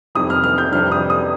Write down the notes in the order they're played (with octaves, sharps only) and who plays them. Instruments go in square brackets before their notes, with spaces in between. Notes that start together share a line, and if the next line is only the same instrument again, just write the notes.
[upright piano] F2 C3 D#3 G3 D#6
F6
F6
G6
F2 C3 G3 D4 F6
D#6
D#6